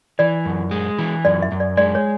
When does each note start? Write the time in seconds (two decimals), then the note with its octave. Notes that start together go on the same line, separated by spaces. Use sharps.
0.19 E3 D5
0.45 F#2
0.71 G#3
0.98 E3
1.25 F#2 D5
1.42 E5
1.52 F#2
1.60 D5
1.77 G#3 D5
1.95 C#5